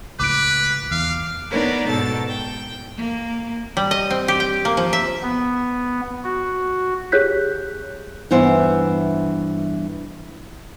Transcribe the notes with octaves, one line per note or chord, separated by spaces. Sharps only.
C#2 A2 B4 D6 D7
E2 F5
B3 D4 D#4 A#4 B4 C#5
G#2 B2 A4 A5 A6
G5
A#3
G3
D#5
C4
G4
G5
A#3
F3
E5
B3
F#4
G4 G#4 C#5 F#6 G6 B6
G2 E3 B3 C5 E5